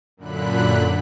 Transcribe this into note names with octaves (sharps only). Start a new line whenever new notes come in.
F#2 A#2 D3 B5 F#6